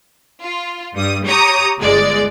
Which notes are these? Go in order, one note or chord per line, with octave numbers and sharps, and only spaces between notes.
F4
G2 G3 D#6
G4 C#5 A#5 D#6
G1 G#3 D5